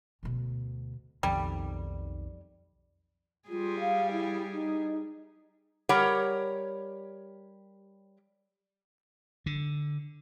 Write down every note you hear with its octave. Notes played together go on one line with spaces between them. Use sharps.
D2 B2
B1 F2 D#3 G3
G3 F4 G#4
F5
E4
D#4
G3 G4 A#4 C#5 F#5
D3